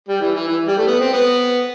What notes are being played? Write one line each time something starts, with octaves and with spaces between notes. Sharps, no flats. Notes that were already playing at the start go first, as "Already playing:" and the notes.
G3
E3
E3
E3
G3
A3
B3
C4
B3